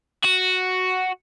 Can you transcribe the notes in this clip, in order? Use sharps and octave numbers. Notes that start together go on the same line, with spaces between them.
F#4